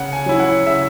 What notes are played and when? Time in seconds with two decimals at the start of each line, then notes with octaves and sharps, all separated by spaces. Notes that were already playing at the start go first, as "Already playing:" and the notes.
Already playing: C#3 F#5
0.13 G#5
0.26 F#3 C#4 E4
0.40 F#5
0.67 C#3 E5